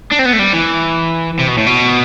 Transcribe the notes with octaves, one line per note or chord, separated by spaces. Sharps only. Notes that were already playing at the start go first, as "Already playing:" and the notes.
D4
C4
B3
A3
G3
E3
C3
B2
A2
B2